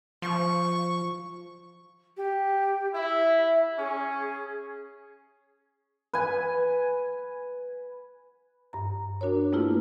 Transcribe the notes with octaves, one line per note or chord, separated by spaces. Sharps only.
F3 C#6
G4
E4 E5
C#4 G#4
B4 G#5
G2 A#5
D4 F#4 A#4 C#5
A3 A#3 E4 F4 G#4 B4